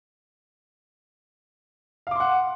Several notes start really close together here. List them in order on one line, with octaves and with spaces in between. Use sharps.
F5 D6 C6 F#5